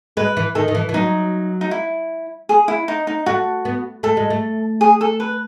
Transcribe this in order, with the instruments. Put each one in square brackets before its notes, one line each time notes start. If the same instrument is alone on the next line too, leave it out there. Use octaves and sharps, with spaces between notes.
[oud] G#3 [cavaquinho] B4
[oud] E3
[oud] D#3 [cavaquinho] A4
[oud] D#3
E3
E3
[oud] F#3 [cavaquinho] D#4
[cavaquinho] D#4
E4
G#4
E4
D#4
D#4
[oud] A3 [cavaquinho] F#4
[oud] B3
[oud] A3 [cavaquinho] A4
[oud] G#3
A3
[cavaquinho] G#4
A4
B4